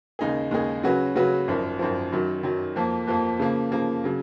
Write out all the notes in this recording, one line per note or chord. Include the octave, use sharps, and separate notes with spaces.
D#2 C#3 G#3 D#4 G#4
D#2 C#3 G#3 D#4 G#4
C#3 F#3 C#4 F#4 B4
C#3 F#3 C#4 F#4 B4
G#1 F#2 F3
G#1 F#2 F3
F#2 D#3 F#3
F#2 D#3 F#3
F2 F3 A#3
F2 F3 A#3
C#3 F3 A#3
C#3 F3 A#3
C#3 F#3